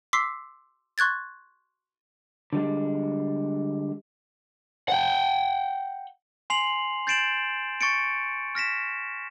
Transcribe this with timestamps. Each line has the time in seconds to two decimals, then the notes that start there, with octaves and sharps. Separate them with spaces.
0.13 C6 D6 E6 B6 C7
0.98 C6 C#6 F#6 G#6 A6
2.53 D3 G3 G#3
4.88 F#5 G5
6.50 G#5 C6 C7 F7 F#7
7.07 G6 A6 C7 D7 E7 F#7
7.81 C#6 A6 C#7 D7
8.55 F6 A#6 B6 E7